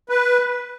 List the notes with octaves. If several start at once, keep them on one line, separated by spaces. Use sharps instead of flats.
B4